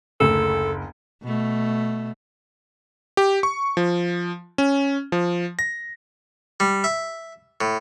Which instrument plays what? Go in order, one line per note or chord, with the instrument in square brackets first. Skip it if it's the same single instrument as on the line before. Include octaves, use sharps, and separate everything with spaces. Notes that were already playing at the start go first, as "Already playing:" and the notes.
[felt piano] F#1 D2 [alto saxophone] A4
[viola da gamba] B2 A3
[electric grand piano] G4
C#6
F3
C#4
F3
A#6
[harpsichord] G3
E5
A2